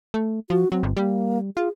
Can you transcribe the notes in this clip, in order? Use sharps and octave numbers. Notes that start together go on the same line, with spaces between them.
A3
F3 F#4
F#3 C4
G1
G3 A#3
F4 G#4